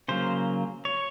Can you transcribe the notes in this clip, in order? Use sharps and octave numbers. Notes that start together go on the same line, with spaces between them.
C#3 F#3 A#3 C5
C#5